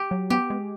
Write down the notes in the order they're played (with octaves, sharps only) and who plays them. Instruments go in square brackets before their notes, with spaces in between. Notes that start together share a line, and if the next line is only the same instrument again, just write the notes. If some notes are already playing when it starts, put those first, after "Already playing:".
Already playing: [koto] G4
[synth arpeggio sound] F#3
[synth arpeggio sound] B3 [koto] G4
[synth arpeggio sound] G#3